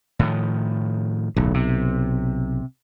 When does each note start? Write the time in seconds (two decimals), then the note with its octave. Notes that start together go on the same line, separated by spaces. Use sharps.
0.19 A2 D#3 F3
1.36 D1 B1
1.54 C3